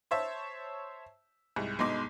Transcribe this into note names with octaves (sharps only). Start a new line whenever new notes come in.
C5 C#5 E5 A5
C2 G#2
G1 B2 G#3 D#4 C6 D6